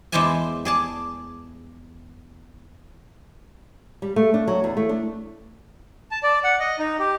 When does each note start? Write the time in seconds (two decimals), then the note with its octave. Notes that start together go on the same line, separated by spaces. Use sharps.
0.12 E2 G#3 C5 D5 E5 G#5
0.65 G#4 D5 A5
4.02 G3
4.16 A3
4.34 D4
4.47 F#3
4.64 E2
4.77 A3
4.89 D4
6.11 A5
6.23 D5
6.44 F#5
6.60 D#5
6.79 D#4
7.00 G4